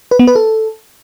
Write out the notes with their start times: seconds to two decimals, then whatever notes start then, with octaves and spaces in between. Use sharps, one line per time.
0.11 B4
0.19 B3
0.27 B4
0.36 A4